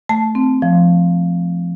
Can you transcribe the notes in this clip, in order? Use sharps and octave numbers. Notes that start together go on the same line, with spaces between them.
A3 A5
C4
F3